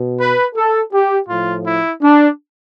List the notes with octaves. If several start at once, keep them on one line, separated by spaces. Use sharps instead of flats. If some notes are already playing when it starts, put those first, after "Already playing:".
Already playing: B2
B4
A4
G4
A2 F3 F4
E4
D4